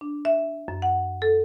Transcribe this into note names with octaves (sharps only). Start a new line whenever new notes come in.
D4
E5
F#2
F#5
A4